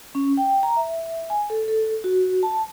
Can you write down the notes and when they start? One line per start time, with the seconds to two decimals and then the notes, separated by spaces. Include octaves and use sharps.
0.15 C#4
0.37 G5
0.63 A#5
0.76 E5
1.30 G#5
1.50 A4
1.68 A4
2.04 F#4
2.43 A5